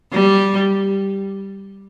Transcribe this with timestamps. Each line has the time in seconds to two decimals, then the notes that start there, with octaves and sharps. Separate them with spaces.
0.12 G3